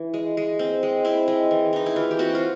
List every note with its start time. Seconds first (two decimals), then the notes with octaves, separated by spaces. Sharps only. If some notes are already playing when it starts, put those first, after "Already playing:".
Already playing: E3
0.14 G#3
0.37 G#3
0.59 C4
0.83 G#3
1.05 C4 E4
1.28 G#3
1.51 E3
1.73 E3 D#4
1.86 E4
1.96 E3 F4
2.11 G4
2.19 C4 F#4
2.35 F4